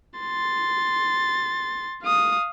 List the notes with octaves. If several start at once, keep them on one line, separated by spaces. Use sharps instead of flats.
C6 A6
F5 D#6